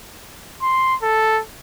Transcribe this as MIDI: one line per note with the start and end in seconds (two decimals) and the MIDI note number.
0.62 0.95 84
1.02 1.40 69